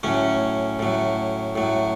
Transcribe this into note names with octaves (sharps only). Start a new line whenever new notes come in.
A2 F#3 C#4
A2 F#3
A2 F#3